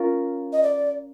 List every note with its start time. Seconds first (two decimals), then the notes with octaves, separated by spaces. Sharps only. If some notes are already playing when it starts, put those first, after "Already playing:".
Already playing: C#4 F4 A#4
0.53 D#5
0.63 D5